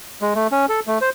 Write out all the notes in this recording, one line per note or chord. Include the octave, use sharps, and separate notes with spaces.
G#3
A3
C#4
A4
A3
C5